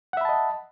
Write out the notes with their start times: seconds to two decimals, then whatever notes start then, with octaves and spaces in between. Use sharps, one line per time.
0.13 F#5
0.17 E5
0.21 B5
0.25 A5
0.29 D#5